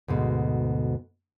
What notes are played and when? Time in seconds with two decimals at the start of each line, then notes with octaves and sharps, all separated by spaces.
0.08 D2 G#2 B2